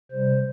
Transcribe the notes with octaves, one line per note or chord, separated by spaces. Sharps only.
C3 G3 C5